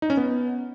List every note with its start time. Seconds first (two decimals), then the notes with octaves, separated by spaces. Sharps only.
0.02 D#4
0.10 C#4
0.17 B3